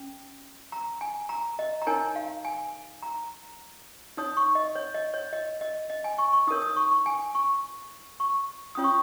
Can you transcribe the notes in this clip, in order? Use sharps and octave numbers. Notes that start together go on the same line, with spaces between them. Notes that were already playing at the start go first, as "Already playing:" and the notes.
Already playing: C#4
A#5
G#5
A#5
D#5
A#5
D#4 A#4 C#5 G#5
F5
G#5
A#5
D#4 C#5 D#6
C#6
D#5
C#5
D#5
C#5
D#5
D#5
D#5
G#5
C#6
C#6
D#4 A#4 C#5 D#6
D#6
C#6
C#6
G#5
C#6
C#6
C#4 F4 C#5 D#6
C#6